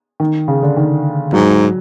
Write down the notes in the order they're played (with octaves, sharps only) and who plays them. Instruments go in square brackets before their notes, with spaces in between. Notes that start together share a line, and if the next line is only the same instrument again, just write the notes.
[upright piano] D#3
C#3
D3
D#3
[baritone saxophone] G#2 [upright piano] F#3